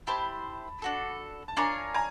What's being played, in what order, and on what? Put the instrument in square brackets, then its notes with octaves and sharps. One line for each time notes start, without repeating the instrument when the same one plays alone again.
[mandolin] E4 G4 C5 [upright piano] A5 B5
[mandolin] D4 F#4 A4
[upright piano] A5
[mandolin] D4 F4 A#4 C#5 [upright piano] G#5 A#5
[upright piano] G#5 A#5